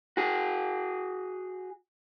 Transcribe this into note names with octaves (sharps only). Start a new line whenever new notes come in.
F#4 G#4